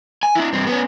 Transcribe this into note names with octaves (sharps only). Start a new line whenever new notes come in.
G#5
D4 E4
G2 C4
B3 C#4